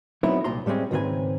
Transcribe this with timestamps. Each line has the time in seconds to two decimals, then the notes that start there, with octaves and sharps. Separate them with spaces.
0.23 F#3 B3 C4 D#4 E4
0.44 C2 A#2 A#5 C6
0.66 A2 G3 G#3 C4 C#4
0.91 C#2 G#2 D#3 C4 B4 G#5